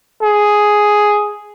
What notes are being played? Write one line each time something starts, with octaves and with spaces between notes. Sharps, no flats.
G#4